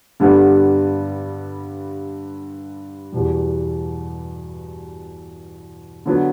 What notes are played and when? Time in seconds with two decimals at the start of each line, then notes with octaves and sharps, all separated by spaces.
0.20 G2 D3 G3 B3
3.12 E2 B2 G3
6.06 D3 F#3 B3